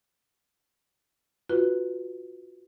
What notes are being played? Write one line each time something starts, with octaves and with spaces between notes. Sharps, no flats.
F4 F#4 B4